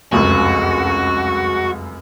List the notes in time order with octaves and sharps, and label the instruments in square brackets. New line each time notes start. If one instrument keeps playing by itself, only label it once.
[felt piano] F1 C#2 F#2 [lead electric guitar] F#4